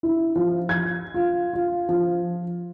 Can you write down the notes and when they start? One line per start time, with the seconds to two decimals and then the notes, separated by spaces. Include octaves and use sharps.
0.03 E4
0.36 F3
0.69 G#6
1.14 F4
1.53 F4
1.89 F3